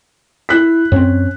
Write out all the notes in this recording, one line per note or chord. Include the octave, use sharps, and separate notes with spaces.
E4 F#6 B6
F#2 C4 C#4